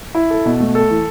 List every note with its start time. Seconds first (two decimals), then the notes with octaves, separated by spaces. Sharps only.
0.15 E4
0.30 A4
0.46 B2
0.60 A3
0.75 A4
0.90 E3